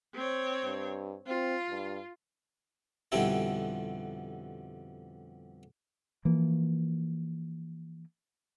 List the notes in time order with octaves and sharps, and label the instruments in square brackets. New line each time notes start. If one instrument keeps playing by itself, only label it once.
[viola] C4 C#5
[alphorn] G2
[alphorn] C4 [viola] F4
[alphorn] G2
[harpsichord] F2 B2 D3 G3 C4 E4
[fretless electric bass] E3 F3 A#3